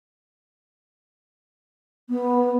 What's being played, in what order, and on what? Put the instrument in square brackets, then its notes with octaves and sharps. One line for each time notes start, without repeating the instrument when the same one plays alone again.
[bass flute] B3